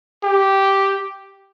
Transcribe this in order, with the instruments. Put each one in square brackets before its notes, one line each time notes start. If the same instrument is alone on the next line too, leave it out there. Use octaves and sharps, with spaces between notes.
[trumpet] G4